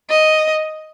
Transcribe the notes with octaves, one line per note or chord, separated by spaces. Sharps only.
D#5